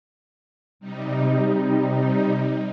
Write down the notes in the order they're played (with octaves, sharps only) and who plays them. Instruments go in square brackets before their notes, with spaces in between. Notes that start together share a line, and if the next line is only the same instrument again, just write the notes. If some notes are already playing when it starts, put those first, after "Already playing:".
[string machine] C3 G3 D#4